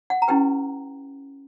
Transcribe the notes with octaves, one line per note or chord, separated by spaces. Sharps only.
F#5
A#5
C#4 E4 G4 B4 G5